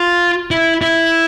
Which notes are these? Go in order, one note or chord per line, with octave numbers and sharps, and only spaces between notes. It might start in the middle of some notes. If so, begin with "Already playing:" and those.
Already playing: F4
E4
E4